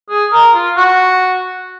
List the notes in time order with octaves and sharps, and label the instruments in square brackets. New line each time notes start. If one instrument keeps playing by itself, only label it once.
[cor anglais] G#4
A#4
F4
F#4